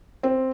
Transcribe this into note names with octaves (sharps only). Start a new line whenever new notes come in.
C4